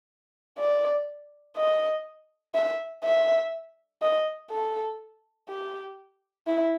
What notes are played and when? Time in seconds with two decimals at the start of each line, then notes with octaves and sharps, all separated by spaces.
0.59 D5
1.57 D#5
2.54 E5
3.04 E5
4.02 D#5
4.51 A4
5.49 G4
6.47 E4